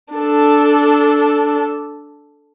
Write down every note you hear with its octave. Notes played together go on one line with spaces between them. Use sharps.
D4 A4